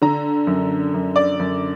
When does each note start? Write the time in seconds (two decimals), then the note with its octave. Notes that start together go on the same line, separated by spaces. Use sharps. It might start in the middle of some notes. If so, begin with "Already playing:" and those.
0.02 D3 A#5
0.47 F#2
0.94 F#2
1.16 D5
1.40 F#2